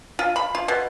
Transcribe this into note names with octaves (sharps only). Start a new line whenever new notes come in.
F4
B5
F4
B2